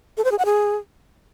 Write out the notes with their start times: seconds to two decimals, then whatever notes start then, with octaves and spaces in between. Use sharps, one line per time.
0.17 A4
0.24 C5
0.31 G#4
0.38 F#5
0.45 G#4